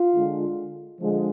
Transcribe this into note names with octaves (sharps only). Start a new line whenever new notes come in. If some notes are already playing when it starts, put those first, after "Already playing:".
Already playing: F4
D3 G#3
D3 F3 G#3